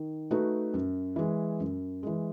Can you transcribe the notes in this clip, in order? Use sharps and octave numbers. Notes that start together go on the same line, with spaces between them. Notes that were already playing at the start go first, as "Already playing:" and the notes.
Already playing: D#3
A3 D#4 F#4 B4
F#2
E3 G#3
F#2
E3 G#3